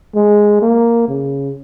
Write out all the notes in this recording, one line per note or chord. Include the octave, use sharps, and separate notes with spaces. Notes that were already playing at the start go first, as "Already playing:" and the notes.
G#3
A#3
C#3